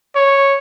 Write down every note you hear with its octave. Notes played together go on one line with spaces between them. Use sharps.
C#5